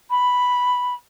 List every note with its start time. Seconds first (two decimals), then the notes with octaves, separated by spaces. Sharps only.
0.10 B5